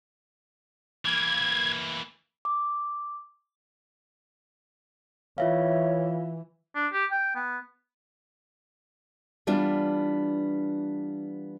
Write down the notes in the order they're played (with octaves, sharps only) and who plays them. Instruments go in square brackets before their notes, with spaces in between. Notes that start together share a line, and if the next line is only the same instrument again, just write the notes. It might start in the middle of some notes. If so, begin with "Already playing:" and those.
[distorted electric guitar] E3 A#3 [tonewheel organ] G#6
[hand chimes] D6
[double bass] E3 [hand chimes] F4 E5 F5 [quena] C#5
[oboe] D4
G4
G5
B3
[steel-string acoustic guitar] E3 G3 B3 D4 F4